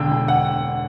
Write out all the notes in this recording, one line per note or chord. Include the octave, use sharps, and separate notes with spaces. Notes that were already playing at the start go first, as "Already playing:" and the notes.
Already playing: E1 D3 G5
E1
F#5